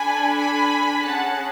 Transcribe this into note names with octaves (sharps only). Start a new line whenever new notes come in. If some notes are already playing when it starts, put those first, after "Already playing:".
Already playing: D4 A4 G#5 B5
G#5 B5
C#4 G#4 F#5 A5